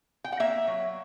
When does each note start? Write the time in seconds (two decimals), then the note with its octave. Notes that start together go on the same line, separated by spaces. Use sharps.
0.24 G5
0.32 F#5
0.40 A#3 E5
0.67 F#3